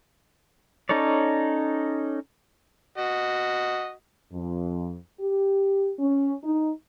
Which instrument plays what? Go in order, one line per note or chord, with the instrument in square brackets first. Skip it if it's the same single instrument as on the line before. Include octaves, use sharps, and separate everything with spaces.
[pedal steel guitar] C#4 D#4 A4 C#5 D5
[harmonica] F#4 D#5
[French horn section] F2
G4
C#4
D#4